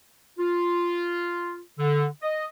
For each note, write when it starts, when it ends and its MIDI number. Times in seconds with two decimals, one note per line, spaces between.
0.39 1.60 65
1.79 2.05 50
2.22 2.46 75